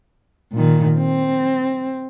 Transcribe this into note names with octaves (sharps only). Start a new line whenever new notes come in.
A#2 D#3
C4